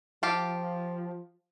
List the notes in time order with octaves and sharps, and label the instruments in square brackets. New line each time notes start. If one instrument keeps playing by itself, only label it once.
[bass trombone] F3 [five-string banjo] G4 F5 A5